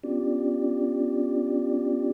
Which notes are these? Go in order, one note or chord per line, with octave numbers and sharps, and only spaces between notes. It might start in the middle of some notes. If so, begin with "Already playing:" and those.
B3 C#4 D4 F4 G4 D5